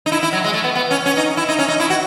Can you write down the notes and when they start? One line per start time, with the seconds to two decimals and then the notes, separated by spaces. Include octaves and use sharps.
0.06 D#4
0.12 E4
0.23 E4
0.33 F#3
0.44 G#3
0.53 A3
0.64 B3
0.75 B3
0.91 C#4
1.06 C#4
1.17 D#4
1.37 E4
1.48 D#4
1.59 C#4
1.68 D#4
1.80 E4
1.90 F#4